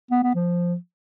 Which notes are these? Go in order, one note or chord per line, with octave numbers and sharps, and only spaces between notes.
B3
B3
F3